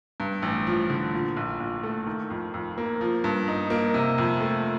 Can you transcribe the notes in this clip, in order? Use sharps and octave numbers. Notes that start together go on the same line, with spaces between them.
G2
A1
F3
D3
A#2
A#1
A#1
A3
D#3
F2
F2
A#3
F3
G2
D#4
A#3
C3
F2
A3